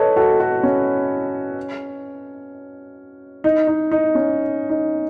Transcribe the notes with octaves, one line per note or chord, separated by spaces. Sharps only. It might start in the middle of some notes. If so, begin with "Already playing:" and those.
Already playing: A4 B4 C#5 D#5
F#4 A4
F#4 A4
C#4
D#4
D#4
D#4
C#4
D#4